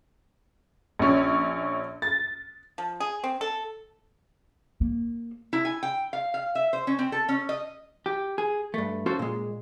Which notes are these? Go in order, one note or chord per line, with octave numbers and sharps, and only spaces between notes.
A#1 C#4
A6
F3
G#4
C4
A4
A#3
E4
G#5
G5
F5
F5
E5
C5
C#4
C4
A4
C#4
D#5
G4
G#4
G2 A3
C#4 F4 F#4 A4 C5
A#2 G#3